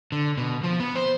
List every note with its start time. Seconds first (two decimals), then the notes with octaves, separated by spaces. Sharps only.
0.12 D3
0.37 B2
0.63 F3
0.80 B3
0.95 C5